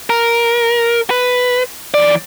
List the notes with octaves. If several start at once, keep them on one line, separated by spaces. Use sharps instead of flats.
A#4
B4
E3 D5